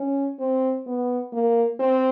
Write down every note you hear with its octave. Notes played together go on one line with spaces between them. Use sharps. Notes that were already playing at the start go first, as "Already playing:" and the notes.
Already playing: C#4
C4
B3
A#3
C4